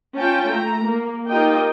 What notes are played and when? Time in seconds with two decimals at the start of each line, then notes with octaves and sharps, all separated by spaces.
0.17 C#4 F4 G5 A5
0.49 A3 A#5
0.86 A#3
1.28 D#4 F4 G4 A#4 D#5 G5